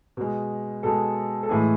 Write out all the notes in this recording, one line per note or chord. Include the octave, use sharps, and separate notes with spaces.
B2 G#3
B2 G#3 A4
A4
A2 E3 G#3 G#4